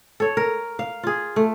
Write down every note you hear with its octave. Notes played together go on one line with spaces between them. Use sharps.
A4 C#5
A#4
F5
F4 G#4
A3